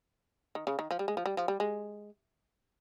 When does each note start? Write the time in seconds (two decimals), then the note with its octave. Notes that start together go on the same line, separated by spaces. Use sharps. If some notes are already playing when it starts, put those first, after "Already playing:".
0.55 D#3
0.67 C#3
0.79 D#3
0.91 F3
0.99 G3
1.08 G#3
1.17 F3
1.26 G3
1.37 F3
1.48 G3
1.60 G#3